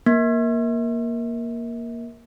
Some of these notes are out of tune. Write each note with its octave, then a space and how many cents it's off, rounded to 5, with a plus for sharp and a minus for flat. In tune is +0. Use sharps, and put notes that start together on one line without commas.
A#3 +10